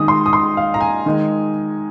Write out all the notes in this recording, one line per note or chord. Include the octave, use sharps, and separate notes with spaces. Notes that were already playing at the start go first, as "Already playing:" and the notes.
Already playing: D#3 G#3 D#6
C6
D#6
C6
F5
A#5
G#5
D#3 G#3